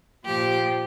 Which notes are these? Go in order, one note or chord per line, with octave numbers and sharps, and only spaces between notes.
A#2 F3 G4